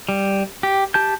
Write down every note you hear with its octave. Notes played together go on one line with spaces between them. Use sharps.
G3
G4
G4 A5 G6